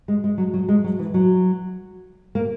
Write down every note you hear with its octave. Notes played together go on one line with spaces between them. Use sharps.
G#3
G#3
F#3
F#3
G#3
F#3
E3
F#3
A#3